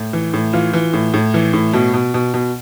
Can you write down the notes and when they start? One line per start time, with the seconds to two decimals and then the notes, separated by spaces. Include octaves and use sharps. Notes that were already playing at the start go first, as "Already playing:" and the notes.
Already playing: A2
0.13 E3
0.34 A2
0.53 E3 F4
0.73 E3
0.93 A2
1.14 A2
1.34 E3
1.53 A2
1.73 B2
1.94 B2
2.14 B2
2.34 B2